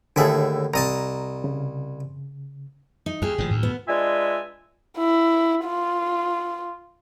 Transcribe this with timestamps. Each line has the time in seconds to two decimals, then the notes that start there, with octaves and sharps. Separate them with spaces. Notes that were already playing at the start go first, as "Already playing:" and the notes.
0.16 D#2 A2 D3 G#4 A4 E5
0.74 C2 D#5 A5 A#5
1.44 C#3
3.06 D#4
3.22 D#2 G4 G#4
3.38 G#1 A2 F3
3.51 D2 A2
3.63 B3
3.88 G#3 D4 F4 B4 E5 G#5
4.98 E4
5.65 F4